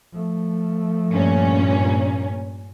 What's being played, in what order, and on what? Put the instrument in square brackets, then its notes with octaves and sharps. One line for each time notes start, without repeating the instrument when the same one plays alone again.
[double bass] F3 A3
[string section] G2 A#2 C#4